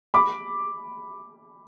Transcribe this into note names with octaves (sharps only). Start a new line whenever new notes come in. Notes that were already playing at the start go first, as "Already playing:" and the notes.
B5 D6